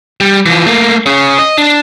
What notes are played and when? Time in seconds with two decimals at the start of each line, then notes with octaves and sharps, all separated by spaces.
0.20 G3
0.46 E3 F3
0.67 A3 A#3
1.06 C#4 G#4
1.38 D#5
1.58 D4